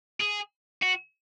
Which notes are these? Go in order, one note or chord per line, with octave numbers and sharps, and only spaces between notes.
G#4
F#4